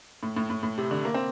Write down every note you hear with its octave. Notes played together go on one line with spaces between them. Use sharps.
A2
A2
A2
A2
C3
D3
A#3
C4